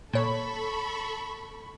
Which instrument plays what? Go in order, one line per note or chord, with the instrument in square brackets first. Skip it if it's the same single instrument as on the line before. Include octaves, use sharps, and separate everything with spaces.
[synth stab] A#2 C#5 [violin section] A4 B5 C#6